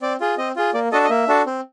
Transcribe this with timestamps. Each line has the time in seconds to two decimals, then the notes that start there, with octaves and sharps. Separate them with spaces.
0.02 C4 D5
0.20 F4 G#4
0.38 C4 D#5
0.56 F4 G#4
0.74 A#3 D5
0.92 D4 F#4 A4 D#5
1.04 D#5
1.10 A#3 E5
1.28 D4 F#4 A4
1.46 C4